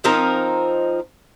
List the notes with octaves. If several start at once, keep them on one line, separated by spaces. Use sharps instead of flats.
F3 C4 D#4 A#4